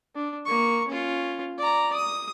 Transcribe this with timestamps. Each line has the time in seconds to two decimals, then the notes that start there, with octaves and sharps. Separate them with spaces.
0.15 D4
0.46 A#3 C#6
0.88 C#4 F4
1.58 D5 A#5
1.93 D#6